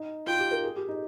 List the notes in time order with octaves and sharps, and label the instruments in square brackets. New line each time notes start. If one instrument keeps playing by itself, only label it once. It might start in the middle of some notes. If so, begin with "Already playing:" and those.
Already playing: [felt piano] D#4
[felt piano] F4 [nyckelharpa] G5
[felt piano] G4
A#4
G#4
G4
D#4